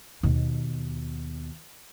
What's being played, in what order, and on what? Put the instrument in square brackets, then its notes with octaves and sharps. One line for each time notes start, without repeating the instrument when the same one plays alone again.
[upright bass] D#2 B2